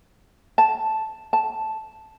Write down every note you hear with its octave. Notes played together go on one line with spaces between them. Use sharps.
A5
A5